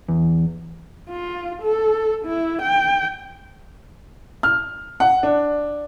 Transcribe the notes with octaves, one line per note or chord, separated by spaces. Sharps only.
E2
F4
A4
E4
G5
F6
F#5
D4